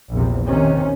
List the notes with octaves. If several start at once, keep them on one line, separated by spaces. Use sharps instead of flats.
A#1 E2 C3
C3 D#3 C#4